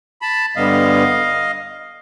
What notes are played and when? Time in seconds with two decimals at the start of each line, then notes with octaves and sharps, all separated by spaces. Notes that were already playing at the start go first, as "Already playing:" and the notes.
0.22 A5 B5
0.56 G2 D3 G3 B3 D#5 F5